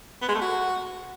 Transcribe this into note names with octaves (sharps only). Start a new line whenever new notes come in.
B3
G#3
A3
F#4